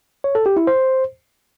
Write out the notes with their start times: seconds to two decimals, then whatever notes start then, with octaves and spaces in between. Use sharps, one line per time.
0.24 C#5
0.35 A4
0.46 G4
0.57 E4
0.67 C5